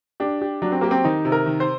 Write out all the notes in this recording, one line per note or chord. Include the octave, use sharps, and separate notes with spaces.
D4 G4
G4
F#3 D4
C4
A#3 G4
C4
D#3 D#4
C3
A#4
D#3
C5